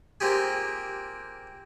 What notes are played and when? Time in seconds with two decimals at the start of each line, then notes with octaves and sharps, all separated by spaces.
0.20 A#3 C4 F4 G4 G#4